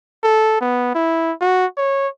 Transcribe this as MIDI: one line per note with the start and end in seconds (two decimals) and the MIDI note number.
0.24 0.59 69
0.61 0.94 59
0.95 1.32 64
1.41 1.66 66
1.77 2.08 73